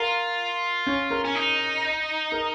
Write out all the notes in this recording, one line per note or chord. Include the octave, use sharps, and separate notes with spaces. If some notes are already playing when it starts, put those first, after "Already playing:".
Already playing: F4 A#4
C#4
A#4
C#4
D#4
A#4